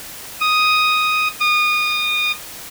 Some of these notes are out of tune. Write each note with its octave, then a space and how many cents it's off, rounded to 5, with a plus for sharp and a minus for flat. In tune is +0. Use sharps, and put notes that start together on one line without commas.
D#6 +5
D#6 -25